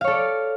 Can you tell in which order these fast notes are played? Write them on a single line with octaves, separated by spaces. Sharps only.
F5 C#5 A4 D5